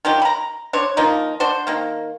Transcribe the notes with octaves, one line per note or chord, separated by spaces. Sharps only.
D#3 F3 F#3 G4
A#5 B5
D4 C5 C#5
D#3 F3 A#3 D#4
D4 F#4 C5
D#3 A#3